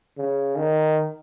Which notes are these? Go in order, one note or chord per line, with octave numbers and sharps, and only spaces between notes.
C#3
D#3